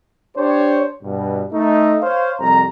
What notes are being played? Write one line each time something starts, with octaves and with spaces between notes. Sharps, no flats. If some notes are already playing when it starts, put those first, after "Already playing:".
D4 G4 C5 C#5
G2 B2
A3 D#4
C5 C#5 F5
C2 F2 A#5